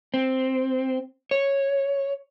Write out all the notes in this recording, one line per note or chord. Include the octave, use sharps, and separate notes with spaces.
C4
C#5